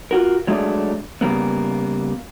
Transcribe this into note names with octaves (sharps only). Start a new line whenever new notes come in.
F4 F#4 A#4
F#3 G#3 A3 D4 G#4 D5
C#3 G3 A#3 B3